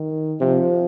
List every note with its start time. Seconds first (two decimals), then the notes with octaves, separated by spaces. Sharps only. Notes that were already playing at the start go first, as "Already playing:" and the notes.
Already playing: D#3
0.41 C3 F3